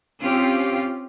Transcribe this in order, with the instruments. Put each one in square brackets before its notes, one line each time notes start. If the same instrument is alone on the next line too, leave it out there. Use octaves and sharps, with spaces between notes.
[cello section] C4 C#4 F4 G4